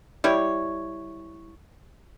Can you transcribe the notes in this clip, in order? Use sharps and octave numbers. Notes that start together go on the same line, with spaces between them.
G3 E4 C#5